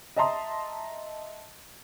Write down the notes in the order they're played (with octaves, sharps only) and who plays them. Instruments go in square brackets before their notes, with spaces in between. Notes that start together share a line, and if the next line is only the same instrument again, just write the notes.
[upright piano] D#5 E5 A5 A#5 C6 D#6